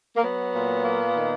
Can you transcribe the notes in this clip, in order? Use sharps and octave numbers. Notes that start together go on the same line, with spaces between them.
A#3
F#3 B3
A#2
A#3
D#3